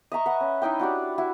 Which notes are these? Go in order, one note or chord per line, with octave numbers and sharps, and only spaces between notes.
D#5 E5 A#5 C#6
B4 F#5
C#4
D#4 E4 D#5 G5
D4 F#4 G4 D5
E4 F#4